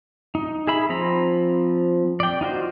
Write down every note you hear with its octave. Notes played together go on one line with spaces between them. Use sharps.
D#4
G#4 E5 B5
F3 C4 A#5 B5
D5 G5
D#4 F4 F#4 C5